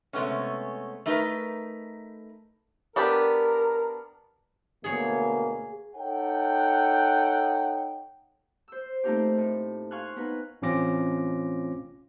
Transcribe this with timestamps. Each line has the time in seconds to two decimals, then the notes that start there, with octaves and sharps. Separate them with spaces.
0.13 C3 G#3 A3 B3 C#4
1.06 A3 D#4 A#4 B4
2.96 B3 D4 G4 A#4
4.84 D2 B2 A#3 G#4 C#5
5.95 D#4 A4 C#5 F#5 G5
8.68 C5 E6
9.03 A3 A#3 C4 D#4 F4 G4
9.37 A2
9.91 F5 G#5 C6 C#6 F6 F#6
10.16 B3 D#4 B4
10.62 A1 C4 C#4 F4 D6 A#6